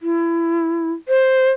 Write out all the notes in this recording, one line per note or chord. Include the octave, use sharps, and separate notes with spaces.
E4
C5